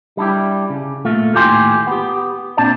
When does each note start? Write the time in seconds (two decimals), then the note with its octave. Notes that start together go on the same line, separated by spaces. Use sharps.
0.17 G3 D4 E4 G4
0.70 C#3
1.05 A#2 A3 F4
1.34 D#2 A2 F4 G4 G#5 C6
1.87 B3 G4
2.57 A#2 C4 D4 D5 A5